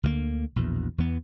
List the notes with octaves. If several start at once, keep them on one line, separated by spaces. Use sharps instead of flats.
D2 D3 E3 A#3
A#1 E2 B2
E2 E3 B3